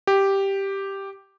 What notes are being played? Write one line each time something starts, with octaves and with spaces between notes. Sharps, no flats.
G4